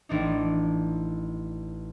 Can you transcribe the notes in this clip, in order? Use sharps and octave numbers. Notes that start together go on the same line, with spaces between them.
A1 E3 D4 D#4